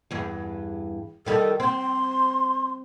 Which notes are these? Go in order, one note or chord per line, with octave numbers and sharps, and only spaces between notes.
E2 G2
D#3 G3 A4
C4 C6